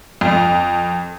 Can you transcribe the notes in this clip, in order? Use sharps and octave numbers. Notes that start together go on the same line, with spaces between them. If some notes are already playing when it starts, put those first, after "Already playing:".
F2